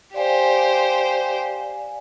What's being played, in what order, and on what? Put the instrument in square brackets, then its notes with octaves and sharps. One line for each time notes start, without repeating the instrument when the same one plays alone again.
[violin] G4 C5 [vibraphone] D5 F5 G#5